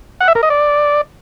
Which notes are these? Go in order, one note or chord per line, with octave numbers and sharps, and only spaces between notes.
F#5
E5
A#4
D#5
D5